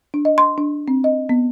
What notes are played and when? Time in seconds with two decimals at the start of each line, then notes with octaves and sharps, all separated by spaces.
0.14 D4
0.25 D#5
0.38 C6
0.58 D4
0.88 C4
1.04 D#5
1.29 B3